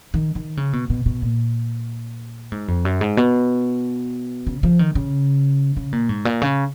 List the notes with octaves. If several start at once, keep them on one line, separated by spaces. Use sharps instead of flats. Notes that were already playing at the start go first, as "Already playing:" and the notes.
D#3
D#3
C#3
B2
B2
B2
A#2
G#2
F2
F#2
G#2
B2
C#3
F3
D#3
C#3
C#3
A#2
G#2
A#2
C#3